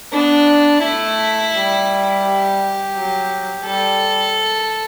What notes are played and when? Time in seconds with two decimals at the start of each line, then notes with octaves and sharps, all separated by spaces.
0.13 B3 D4
0.83 A3 E4
1.55 G3
2.25 G4
2.95 F#3
3.65 G3 A4